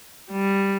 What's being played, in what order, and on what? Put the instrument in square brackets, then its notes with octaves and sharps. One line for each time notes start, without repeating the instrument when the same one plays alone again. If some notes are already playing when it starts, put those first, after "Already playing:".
[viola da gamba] G3